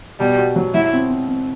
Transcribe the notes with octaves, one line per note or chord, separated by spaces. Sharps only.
B2 G3
F#4
F#3
F#3 E4
C4
C4
C4